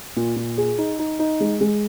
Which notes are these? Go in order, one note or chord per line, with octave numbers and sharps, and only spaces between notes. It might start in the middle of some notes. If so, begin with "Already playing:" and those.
A#2
A#2
G#4
D#4
D#4
D#4
G#3
G#3